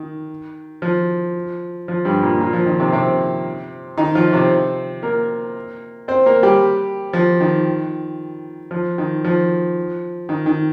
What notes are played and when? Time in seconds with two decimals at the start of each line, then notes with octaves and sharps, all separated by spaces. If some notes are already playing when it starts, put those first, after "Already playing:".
Already playing: D#3
0.82 F3
1.88 F3
2.05 G2 G3
2.22 A#2 A#3
2.40 A#2 A#3
2.53 F3
2.66 D#3
2.79 C3 C4
2.92 C3 C4
3.97 D#3 D#4
4.15 F3 F4
4.33 C3 C4
5.03 A#3 A#4
6.08 C4 C5
6.26 A#3 A#4
6.43 G3 G4
7.13 F3
7.40 D#3
8.71 F3
8.98 D#3
9.24 F3
10.29 D#3
10.46 D#3